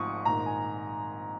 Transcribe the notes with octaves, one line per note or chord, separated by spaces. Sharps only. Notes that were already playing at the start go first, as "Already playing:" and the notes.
Already playing: G#1 G#2 F3 C#6 D#6
A#1 G#2 D#3 A#5
G#5